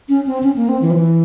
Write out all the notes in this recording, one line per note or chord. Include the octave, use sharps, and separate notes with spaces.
C#4
C4
C#4
A#3
C4
E3
F3
E3